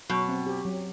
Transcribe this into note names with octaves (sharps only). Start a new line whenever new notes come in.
B2 F#3
C4
G4
F#3